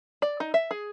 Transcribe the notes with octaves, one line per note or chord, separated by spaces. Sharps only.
D5
D#4
E5
G#4